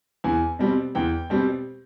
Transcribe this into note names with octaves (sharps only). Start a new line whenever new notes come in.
E2 G#5
B2 G3 C4
E2 G5
B2 G3 C4